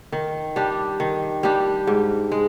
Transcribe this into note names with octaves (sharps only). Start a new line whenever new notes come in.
D#3
G3 D4 G4
D#3
G3 D4 G4
G#2
G#3